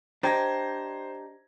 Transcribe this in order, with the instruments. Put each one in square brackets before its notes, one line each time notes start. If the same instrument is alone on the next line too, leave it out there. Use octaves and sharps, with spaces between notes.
[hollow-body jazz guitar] D4 G4 [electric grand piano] C5 G#6 A#6 [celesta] D#5 A#5